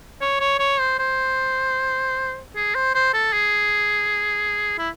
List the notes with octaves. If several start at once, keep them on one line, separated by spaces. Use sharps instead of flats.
C#5
C#5
C#5
C5
C5
G#4
C5
C5
A4
G#4
E4